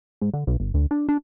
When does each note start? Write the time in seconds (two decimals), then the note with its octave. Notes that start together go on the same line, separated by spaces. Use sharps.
0.21 G#2
0.34 D3
0.47 B1
0.60 G1
0.74 D2
0.91 D4
1.09 D4